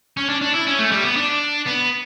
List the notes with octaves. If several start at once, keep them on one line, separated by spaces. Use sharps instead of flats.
C#4
D4
D4
E4
C#4
A3
G3
B3
D4
B3